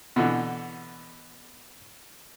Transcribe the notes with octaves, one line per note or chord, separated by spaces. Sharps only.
B2 D3 E3